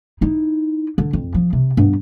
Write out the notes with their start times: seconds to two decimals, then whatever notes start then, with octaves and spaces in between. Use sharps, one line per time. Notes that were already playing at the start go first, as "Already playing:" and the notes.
0.21 D#4 E4
0.98 D3
1.13 F2
1.34 F3
1.53 C3
1.77 G2 B3